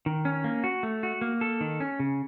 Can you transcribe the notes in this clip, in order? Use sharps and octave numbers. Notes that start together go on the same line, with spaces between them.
D#3
C#4
A#3
F#4
A3
F#4
A#3
A4
D#3
C#4
C#3